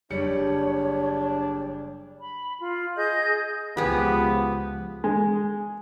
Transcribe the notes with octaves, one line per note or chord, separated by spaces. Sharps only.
F#1 G3 D4 C#5 C#7
B5
F4
G#4 D#5 G6
C#2 F3 B3 G4 G#4
G#3